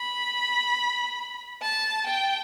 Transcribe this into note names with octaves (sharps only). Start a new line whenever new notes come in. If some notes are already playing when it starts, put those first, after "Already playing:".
Already playing: B5
A5
G5